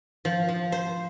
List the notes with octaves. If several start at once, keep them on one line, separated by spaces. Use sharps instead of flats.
F3
F3
C5